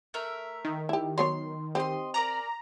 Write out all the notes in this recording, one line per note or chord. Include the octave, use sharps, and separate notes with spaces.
A3 A#4 E5
D#3
E4 G4
F#3 B3 C#5 C6
C4 G4 D#5 C6
A#4 D5 G#5 A#5